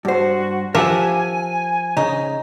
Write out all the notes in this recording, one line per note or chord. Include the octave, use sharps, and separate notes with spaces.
G2 F#4 C5
F3 G4 A#4 E5 F#5 G#5
C#3 D#4